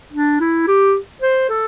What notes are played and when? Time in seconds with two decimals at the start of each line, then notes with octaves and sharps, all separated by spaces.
0.13 D4
0.41 E4
0.67 G4
1.22 C5
1.49 A4